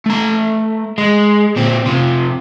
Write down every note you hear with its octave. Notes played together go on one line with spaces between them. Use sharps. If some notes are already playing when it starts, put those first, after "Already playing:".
A3 A#5
G#3
A#2 C4
C3 F4